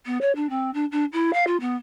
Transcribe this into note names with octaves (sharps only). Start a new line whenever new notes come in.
B3
C#5
D4
C4
D4
D4
E4
F5
F4
B3